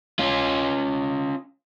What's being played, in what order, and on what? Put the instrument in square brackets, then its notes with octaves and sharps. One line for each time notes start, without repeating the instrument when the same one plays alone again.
[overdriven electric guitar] C#4 F4